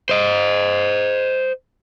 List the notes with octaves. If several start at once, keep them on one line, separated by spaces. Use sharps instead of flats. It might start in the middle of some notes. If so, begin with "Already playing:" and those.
C5 D#5